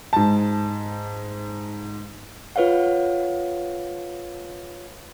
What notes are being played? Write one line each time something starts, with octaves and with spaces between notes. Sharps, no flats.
G#2 A5
F4 B4 C#5 F5 F#5